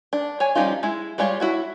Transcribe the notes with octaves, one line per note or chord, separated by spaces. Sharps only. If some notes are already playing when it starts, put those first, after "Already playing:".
D4
C#5 G#5
F3 G3 C#4 D#4 F4
G#3 E4
G3 G#3 F4 C#5
E4 F#4 C#5